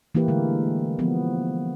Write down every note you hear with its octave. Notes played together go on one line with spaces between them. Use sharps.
E3 A#3 E4 G4 B4
D3 G#3 A3
F3 B3